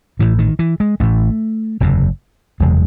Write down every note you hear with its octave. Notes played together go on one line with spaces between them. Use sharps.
A1 A2 E3
D#3
E3
G#3
A1 A2 A3
F#1 E2 C3
F#1 E2 C3 G#3